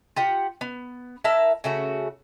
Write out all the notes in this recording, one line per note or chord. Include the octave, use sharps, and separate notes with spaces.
F4 G4 F#5
B3
E4 A#4 E5 A5
C#3 A3 F#4